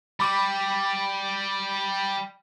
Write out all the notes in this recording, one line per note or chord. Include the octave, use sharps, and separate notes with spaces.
G3 B5 D6